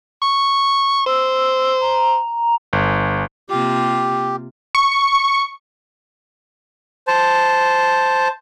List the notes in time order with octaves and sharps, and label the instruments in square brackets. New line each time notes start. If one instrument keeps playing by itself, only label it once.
[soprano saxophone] C#6
[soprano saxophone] C5 [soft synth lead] E6
[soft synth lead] A#5
[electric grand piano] G1
[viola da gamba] C3 A#3 F4 [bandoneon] G4
[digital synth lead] C#6
[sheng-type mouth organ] C5 A5